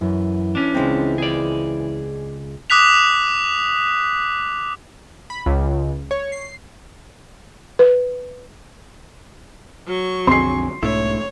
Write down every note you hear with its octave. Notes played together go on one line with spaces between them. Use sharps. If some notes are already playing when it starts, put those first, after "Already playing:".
F#2 E3
C#4 D4
C#2 G#3 C4
G#4 D5
D6 D#6 F#6 B6 F7
B5
C#2
C#5
C7
B4
F#3 C#6
B1 F2 D3 C4 G#4 C6 C7
B1 G#2 A3 D4 E4 C#5